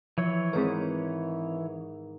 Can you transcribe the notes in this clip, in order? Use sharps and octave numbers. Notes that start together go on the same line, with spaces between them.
E3 F3 C#5
G#2 D#3 C4 B4